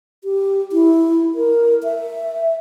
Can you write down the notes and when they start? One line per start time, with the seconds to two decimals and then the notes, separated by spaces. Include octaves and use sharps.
0.24 G4
0.72 E4
1.35 A#4
1.83 E5